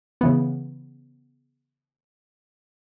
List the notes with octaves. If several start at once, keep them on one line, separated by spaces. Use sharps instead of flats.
C#3 E3 B3